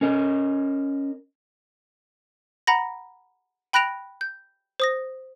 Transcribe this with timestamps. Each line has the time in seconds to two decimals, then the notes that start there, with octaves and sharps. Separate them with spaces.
0.01 C#4 A#4 D#5
2.67 F#5 A#5 B5 A#6
3.73 G5 B5 F#6 A#6 D7 F7
4.21 G6
4.80 C5 D#6 A#6